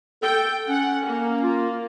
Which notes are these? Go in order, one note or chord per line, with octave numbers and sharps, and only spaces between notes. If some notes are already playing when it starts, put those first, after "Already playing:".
A4 G5
C#4 F#5
A#3
F4